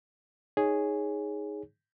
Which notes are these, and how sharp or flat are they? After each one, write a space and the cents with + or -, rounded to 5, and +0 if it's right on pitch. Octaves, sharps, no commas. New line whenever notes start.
D#4 +0 G#4 +0 C#5 +0